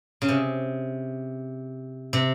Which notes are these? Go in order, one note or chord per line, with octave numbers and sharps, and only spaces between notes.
C#3
C3
C3